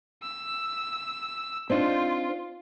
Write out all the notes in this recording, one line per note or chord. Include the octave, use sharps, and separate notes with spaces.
E6
C4 D4 D#4 F4